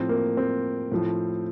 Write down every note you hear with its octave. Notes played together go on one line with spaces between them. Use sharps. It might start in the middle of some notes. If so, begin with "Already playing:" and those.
Already playing: A2 F3 C4
A#3
C4
A2 F3